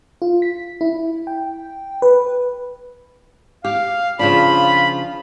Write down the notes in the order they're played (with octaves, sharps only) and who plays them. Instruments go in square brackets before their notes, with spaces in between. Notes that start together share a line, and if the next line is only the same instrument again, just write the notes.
[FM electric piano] F4
B6
E4
G5
B4
[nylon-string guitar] G4 [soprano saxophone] F5
[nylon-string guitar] C#3 F3 D4 [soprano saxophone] F4 [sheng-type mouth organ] B5